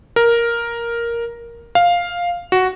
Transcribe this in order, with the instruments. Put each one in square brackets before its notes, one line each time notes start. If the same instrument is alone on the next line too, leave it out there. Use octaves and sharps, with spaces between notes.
[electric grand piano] A#4
F5
F#4